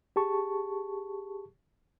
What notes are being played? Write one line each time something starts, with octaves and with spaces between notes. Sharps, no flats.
G4 G#4 A5 C#6